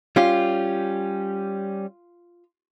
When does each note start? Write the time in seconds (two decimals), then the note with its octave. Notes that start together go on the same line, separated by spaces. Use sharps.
0.16 G3 C#4 F4 G4